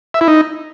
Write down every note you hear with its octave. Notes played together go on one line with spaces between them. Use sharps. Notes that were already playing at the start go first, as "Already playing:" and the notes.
E5
E4
D#4